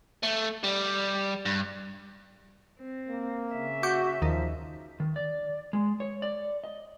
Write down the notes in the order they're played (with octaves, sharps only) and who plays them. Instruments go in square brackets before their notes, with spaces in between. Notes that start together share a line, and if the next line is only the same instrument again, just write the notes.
[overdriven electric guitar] A3
G3
G2
[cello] C4
[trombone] A#3
[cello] C#3 E5
[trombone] F#4 [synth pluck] C#6 D6 G6
[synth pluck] D#2 D#3 [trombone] F3
[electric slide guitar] D#3
D5
G#3
C#5
D5
D#5